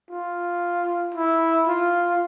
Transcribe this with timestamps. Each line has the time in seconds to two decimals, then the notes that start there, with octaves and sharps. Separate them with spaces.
0.11 F4
1.14 E4
1.67 F4